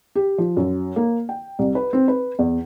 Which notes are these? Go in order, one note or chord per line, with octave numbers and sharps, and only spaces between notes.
G4
F3
F#2
A#3
G5
C2
B4
C4
B4
E2